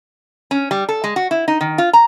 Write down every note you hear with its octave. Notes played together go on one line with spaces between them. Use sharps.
C#4
G3
A4
G#3
F#4
E4
D#4
D#3
F4
A#5